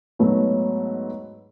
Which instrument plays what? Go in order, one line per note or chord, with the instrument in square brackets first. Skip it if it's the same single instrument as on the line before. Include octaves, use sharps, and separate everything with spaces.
[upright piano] G#2 F#3 A3 B3